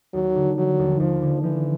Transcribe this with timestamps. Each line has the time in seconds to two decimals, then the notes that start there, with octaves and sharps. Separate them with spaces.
0.14 D#2 F#3
0.36 D3
0.57 F3 F#3
0.79 D#2
0.99 D#2 F3
1.22 D3
1.43 E3 F3